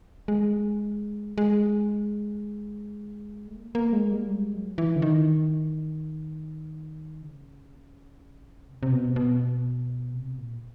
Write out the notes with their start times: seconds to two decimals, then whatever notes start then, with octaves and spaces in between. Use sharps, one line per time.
0.28 G#3
1.38 G#3
3.47 A3
3.56 A#3
3.75 A#3
3.93 G#3
4.11 G3
4.29 G#3
4.54 F#3
4.78 E3
4.96 D3
5.02 D#3
7.22 C#3
8.68 C3
8.83 C3
8.92 B2
9.16 B2
10.14 C3
10.38 A#2